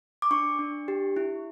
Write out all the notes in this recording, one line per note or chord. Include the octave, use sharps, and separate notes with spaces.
D6
D4 C#6
D4
G4
E4